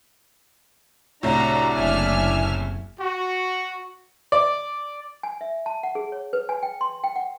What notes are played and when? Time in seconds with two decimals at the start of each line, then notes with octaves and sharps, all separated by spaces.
1.23 C2 A2 D4 F#4 A#5
1.75 F#1 E5 G#5 F6
2.99 F#4
4.32 D5
5.23 G#5
5.41 E5
5.66 A5
5.83 F#5
5.95 G#4
6.12 C#5
6.33 B4
6.49 G#5
6.63 G5
6.81 C6
7.04 G5
7.16 F#5